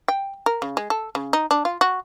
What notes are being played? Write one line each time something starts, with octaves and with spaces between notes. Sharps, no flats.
G5
A#4
C#3
G#3
A4
C#3
D#4
D4
F4
F#4